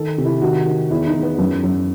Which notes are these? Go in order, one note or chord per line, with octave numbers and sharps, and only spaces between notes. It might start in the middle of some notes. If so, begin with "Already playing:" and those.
Already playing: D#3 A4
C3
E4
D#3 F#4
D#3
E2 E4
D#4
E2
B3
F#2
F#2